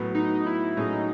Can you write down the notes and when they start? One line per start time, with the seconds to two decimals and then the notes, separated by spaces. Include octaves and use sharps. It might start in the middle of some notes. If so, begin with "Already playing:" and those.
Already playing: A2 F#3 B3
0.15 D#4
0.46 E4
0.77 A2 F#3 C#4 D#4 G#4